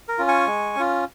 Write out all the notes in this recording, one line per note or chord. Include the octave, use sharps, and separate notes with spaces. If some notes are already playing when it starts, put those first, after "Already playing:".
A#4
C#4 F4
G#5 C#6
G#3
C#4 F4